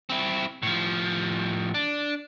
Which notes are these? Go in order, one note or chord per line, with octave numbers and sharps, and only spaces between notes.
C4 E4
A2 F3
D4